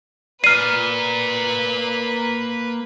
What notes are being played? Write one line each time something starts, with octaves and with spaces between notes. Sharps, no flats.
A#3 B4 D5 F6 C7 D#7